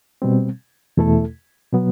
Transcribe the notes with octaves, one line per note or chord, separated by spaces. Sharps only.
B2 G3 C4
E2 B2 A3 E4 A4
B2 F#3 B3